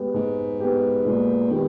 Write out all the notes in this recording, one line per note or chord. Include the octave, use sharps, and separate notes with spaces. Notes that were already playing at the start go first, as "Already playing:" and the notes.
Already playing: G#3 B3 G4
G#2 G#3
B3 G4
A#2 G#3
D#3 B3 G4